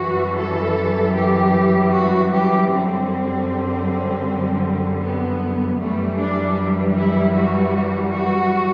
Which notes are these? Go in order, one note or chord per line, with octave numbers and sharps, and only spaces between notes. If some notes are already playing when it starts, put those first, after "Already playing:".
Already playing: F#2 E3 G3 F#4
A4
G4
F#4
G4
F#2 D3 G3 C4
B3
F#2 E3 G3 A3
D4
E4
F#4
F#4